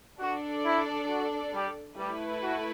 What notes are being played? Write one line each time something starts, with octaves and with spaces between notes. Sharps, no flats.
D4 F#4 A4 D5
E4
F#4
G3 G4
G3 A3 E4 G4 B4
F#4